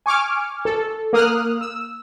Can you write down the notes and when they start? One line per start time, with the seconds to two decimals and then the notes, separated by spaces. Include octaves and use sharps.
0.06 G#5 C#6 D6 F6
0.65 A4
1.13 A#3 D#6 F6 F#6
1.61 E6